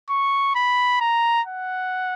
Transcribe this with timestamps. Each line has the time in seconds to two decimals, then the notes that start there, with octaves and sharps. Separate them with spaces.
0.09 C#6
0.55 B5
1.00 A#5
1.46 F#5